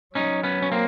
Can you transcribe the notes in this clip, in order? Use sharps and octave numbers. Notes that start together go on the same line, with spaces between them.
F#3 C#4 D#4
B3 C#4
C#4
A#3 C4